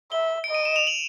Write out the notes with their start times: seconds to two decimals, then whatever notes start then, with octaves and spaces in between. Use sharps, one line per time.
0.12 E5 G7
0.44 D7
0.49 D#5
0.55 D#7
0.65 E7
0.76 F7
0.87 F#7